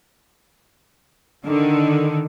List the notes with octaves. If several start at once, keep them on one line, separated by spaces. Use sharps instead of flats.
D3 D#3